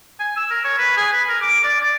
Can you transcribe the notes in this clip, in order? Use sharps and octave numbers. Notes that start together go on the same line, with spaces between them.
G#5
E6
A#4
C#5
B4
G#4
B4
A#4
D6
D5
D5